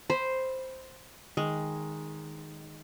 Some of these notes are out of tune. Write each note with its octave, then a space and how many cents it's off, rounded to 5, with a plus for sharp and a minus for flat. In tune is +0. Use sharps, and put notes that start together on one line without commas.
C5 +0 B5 -10
D#3 +0 G#3 +0